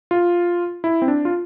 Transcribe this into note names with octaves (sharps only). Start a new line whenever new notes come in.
F4
E4
C4
D4
F4